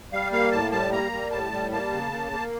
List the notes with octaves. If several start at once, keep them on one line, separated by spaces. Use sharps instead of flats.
G3 F5
A#3 F5
A2 A5
G3 A5
A#3 A#5
G3
A2 A5
G3
A#3 A5
C#3
A#3
A#3